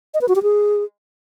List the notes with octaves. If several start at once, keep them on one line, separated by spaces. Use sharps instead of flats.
D#5
B4
F#4
G4
G#4